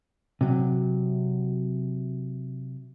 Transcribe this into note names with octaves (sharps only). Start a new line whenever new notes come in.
C3 F#3